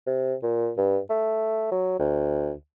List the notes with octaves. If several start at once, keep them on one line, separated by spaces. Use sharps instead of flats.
C3
A#2
G2
A3
F#3
D2